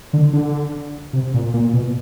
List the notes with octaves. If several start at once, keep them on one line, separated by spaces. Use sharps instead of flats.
D3
D3
C3
A#2
A#2
B2